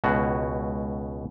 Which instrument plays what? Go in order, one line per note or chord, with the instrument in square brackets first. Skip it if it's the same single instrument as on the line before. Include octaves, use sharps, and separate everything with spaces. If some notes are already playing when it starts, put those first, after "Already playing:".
[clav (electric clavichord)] C#2 B2 F#4